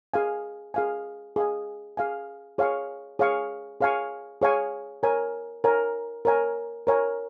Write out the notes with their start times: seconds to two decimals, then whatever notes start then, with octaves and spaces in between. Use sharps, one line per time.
0.14 G#4 F5 G#5
0.74 G#4 F5 G#5
1.36 G#4 F5 G#5
1.97 G#4 F5 G#5
2.58 G#4 C#5 F5 G#5 C#6
3.19 G#4 C#5 F5 G#5 C#6
3.81 G#4 C#5 F5 G#5 C#6
4.42 G#4 C#5 F5 G#5 C#6
5.03 A#4 C#5 G#5
5.64 A#4 C#5 G#5
6.25 A#4 C#5 G#5
6.87 A#4 C#5 G#5